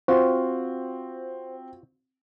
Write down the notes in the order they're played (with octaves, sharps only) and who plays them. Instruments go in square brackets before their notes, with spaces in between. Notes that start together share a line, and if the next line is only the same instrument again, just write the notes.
[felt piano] C4 [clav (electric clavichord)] F4 F#4 [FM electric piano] C5